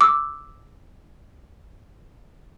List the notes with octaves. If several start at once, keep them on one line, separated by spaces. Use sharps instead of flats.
D6 E6